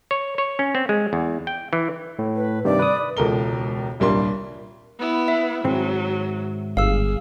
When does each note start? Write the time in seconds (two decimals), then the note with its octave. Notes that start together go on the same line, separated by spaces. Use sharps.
0.11 C#5
0.38 C#5
0.59 C#4
0.75 C4
0.89 G#3
1.13 E2
1.47 G5
1.73 E3
2.19 A2
2.36 B4
2.65 G2 C3 D#3 D5
2.79 B4 D#6
3.17 E1 C#2 A4 A#4 G7
4.00 D#1 C2 G3 A#3 D4 C6
4.99 B3 E4
5.28 E5
5.64 G#2 D#3 F#3 C4
6.77 G1 G#4 F5 E6